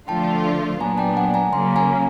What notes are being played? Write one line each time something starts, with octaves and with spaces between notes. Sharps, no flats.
D3 F3 A3 D4 F4 G5 A5
A#2 F#3 B3 D4 G#5 A#5
G5 A5
F#5 G#5
G#5 A#5
C#3 F#3 A#3 A#5 C6
G#5 A#5